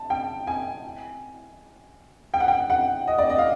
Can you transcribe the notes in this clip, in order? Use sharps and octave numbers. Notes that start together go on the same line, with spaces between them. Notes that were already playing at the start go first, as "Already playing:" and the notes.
Already playing: A5
G5
G#5
G5
F#5
G5
F#5
D#5
D5
D#5
F5